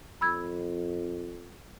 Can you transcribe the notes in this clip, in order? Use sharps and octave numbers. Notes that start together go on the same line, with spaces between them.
F2 B5 E6 G#6